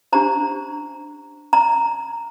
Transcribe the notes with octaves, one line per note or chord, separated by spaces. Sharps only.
D4 G4 C5 A#5
A#5